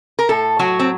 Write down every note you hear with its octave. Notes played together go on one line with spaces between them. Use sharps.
A#4
A2 A4
F#3 F#4
C4